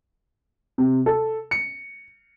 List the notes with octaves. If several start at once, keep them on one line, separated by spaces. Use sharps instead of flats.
C3
A4
C#7